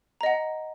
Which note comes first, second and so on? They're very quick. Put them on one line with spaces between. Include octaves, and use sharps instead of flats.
A#5 D#5 F#5